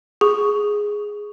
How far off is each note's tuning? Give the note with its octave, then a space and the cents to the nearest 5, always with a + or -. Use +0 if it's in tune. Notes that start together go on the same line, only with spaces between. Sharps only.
G#4 +0 C#6 +10